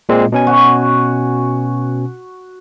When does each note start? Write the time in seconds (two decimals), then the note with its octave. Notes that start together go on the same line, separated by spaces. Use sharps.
0.09 A#2 G#3 C4
0.32 B2 C#4 G#5
0.47 F#4